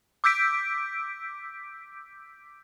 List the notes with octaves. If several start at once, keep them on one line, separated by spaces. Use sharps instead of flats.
D6 E6 G6 B6 D7